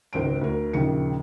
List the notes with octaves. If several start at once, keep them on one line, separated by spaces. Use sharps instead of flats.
G#1 C#2 C5 D7
D2 A#4
A#1 D#2 C#3 C#7